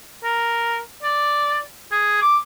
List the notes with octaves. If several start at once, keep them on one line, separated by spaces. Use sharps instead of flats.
A#4
D5
G#4
D6